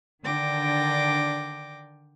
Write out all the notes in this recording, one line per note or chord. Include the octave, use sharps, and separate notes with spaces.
D3 D#3 D4 G5 D6 A#6